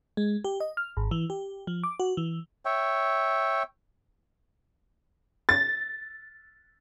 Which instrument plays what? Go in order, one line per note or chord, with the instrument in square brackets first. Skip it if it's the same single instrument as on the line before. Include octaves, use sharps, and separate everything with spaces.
[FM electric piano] G#3
G4
D#5
F6
G#1
E3
G4
F3
D6
F#4
E3
[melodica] C#5 E5 G5
[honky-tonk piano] A6